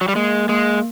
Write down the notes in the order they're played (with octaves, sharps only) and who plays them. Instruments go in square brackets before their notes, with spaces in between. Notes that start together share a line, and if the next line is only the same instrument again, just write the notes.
[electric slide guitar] F#3
G3
[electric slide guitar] G#3 [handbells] A#3
[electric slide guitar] G#3 [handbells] A#3